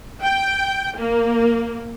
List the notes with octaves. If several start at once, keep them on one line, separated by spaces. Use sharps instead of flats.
G5
A#3